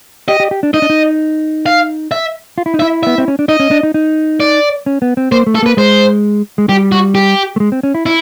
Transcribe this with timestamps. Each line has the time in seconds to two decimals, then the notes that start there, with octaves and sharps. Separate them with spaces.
0.28 G4 D#5
0.40 G4
0.51 G4
0.63 D4
0.74 D#4 D#5
0.82 D4
0.90 D#4
1.66 F5
2.11 E5
2.58 F4
2.66 E4
2.74 D#4
2.80 E4 E5
3.03 B3 E5
3.18 C4
3.28 C#4
3.39 D4
3.48 D#4 D#5
3.60 C#4
3.71 D4
3.83 D#4
3.94 D#4
4.40 D5
4.86 C#4
5.02 B3
5.17 C4
5.32 A#3 C5
5.47 A3
5.55 A4
5.63 A#3 B4
5.77 G#3 C5
6.58 G#3
6.69 G3 G4
6.92 F#4
7.15 G4
7.56 A3
7.60 G#3
7.72 C4
7.83 C#4
7.95 E4
8.06 E4